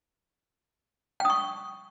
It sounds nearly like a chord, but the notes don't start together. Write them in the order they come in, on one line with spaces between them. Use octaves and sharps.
G5 D#6 C#6